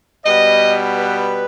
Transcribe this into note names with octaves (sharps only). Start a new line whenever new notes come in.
B2 G3 B3 D#5
B4